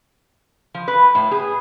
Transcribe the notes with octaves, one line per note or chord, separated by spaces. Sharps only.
F3
B4
A2
G#4